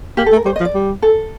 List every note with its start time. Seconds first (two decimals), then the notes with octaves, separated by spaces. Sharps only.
0.17 A#3 G4
0.26 A4
0.32 A3
0.36 A#4
0.45 G3 C5
0.56 D#5
0.60 F3
0.65 D5
0.74 G3
1.02 A4